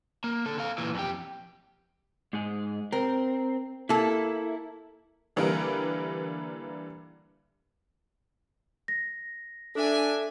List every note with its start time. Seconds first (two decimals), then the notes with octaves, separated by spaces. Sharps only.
0.24 A#3
0.46 D3 A4
0.58 A4 F5
0.78 A#2 E3
0.95 F2 G4
2.33 G#2 G#3 G#4
2.92 C4 A#4
3.89 A#3 E4 A4
5.36 D3 E3 G3 A#3 A#4 B4
8.88 A#6
9.75 D4 A4 E5 G#5